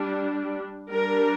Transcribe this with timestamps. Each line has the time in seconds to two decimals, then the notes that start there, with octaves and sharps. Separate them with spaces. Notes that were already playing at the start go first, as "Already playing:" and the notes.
Already playing: G3 D4
0.90 G3 D4 A#4